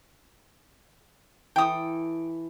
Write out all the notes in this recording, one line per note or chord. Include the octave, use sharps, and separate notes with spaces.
E3 A4 G5 D#6